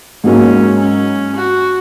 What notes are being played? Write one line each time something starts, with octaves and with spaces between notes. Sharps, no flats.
G#2 F#3 A#3 C#4
C#4
F#4